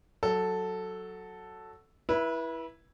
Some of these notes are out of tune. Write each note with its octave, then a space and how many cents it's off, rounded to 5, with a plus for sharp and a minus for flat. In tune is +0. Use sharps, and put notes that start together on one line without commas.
F#3 +0 A4 +0
E4 +0 B4 -30 E5 +0